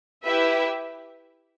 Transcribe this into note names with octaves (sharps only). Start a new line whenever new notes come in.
E4 G4 B4 E5